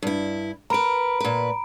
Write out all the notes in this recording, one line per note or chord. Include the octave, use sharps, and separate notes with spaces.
G2 E4
A#4 B4 A#5 B5 D7
A#2 B4